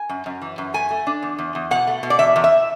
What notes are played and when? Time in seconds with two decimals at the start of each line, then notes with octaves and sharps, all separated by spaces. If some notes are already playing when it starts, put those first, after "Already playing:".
Already playing: G#5
0.09 F#2
0.26 F#2
0.41 E3
0.58 F#2
0.74 A3 G#5
0.91 A3
1.07 D4
1.22 E2
1.38 E2
1.55 E2
1.71 B2 F#5
1.87 A3
2.03 B2
2.10 D5
2.19 E2 E5
2.36 E2
2.44 E5